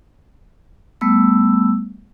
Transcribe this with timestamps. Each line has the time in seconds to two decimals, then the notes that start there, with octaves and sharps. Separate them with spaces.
1.01 G3 A3 B3 E6